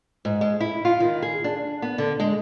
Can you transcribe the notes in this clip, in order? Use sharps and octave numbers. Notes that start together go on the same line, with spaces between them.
G#2
G#3
E4
F4
D#3
G#4
D4
B3
D3
G#3